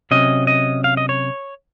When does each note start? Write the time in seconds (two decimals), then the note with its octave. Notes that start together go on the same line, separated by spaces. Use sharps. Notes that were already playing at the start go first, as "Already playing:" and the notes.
0.11 C3 F#3 C#4 D#5
0.47 D#5
0.84 F5
0.97 D#5
1.09 C#5